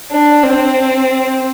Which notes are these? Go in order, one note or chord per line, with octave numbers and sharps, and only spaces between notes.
D4
C4